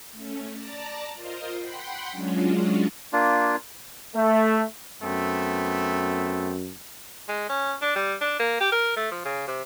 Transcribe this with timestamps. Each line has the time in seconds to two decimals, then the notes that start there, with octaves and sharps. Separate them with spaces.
0.12 A3 C#4
0.52 D5 A5 A#5
1.13 F4 A#4 C5 D#5
1.57 F#5 G5 B5 C6
2.12 F#3 G#3 C#4 D4 F4 F#4
3.13 A#3 D4 F4
4.16 A3
5.02 F#2 A3 B3 C4
7.28 G#3
7.49 C#4
7.82 D4
7.96 G3
8.21 D4
8.39 A#3
8.60 G4
8.72 A#4
8.97 A3
9.11 F3
9.25 C#3
9.47 C3